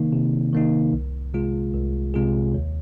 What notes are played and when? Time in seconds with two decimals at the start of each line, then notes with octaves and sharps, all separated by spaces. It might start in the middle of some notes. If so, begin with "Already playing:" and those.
Already playing: C3 D#3 A#3 D#4
0.13 C3
0.53 D#3 A#3 D#4
0.93 C2
1.34 C3 G#3 F4 G#4
1.74 C2
2.14 C3 G#3 F4 G#4
2.54 D#2